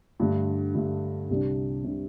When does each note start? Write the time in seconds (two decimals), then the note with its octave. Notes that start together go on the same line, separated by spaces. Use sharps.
0.20 G2 D3 A3
0.75 G2 D3 A3
1.30 C2 C3 G3 D4
1.84 C3 G3 D4